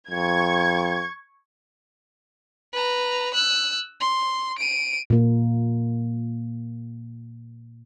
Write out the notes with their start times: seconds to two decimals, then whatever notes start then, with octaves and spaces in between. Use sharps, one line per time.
0.10 F2 C#6 G#6
2.73 B4 A#5
3.34 E6 F#6
4.01 C6
4.58 D7 D#7
5.10 A#2 A#3